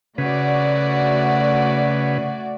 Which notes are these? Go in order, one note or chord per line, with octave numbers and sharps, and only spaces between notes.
C#3 A3 F#4 B4 D5